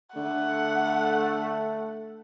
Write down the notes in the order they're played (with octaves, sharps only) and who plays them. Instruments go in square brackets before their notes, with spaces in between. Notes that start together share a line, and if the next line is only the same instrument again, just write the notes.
[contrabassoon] D3 [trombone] A3 [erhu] F#5